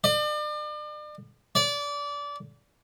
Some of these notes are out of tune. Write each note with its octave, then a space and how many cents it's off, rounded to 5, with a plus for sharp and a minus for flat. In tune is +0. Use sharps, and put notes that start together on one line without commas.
D5 +40
D5 -25